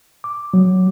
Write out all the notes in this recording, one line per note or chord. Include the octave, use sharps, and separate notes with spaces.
D6
F#3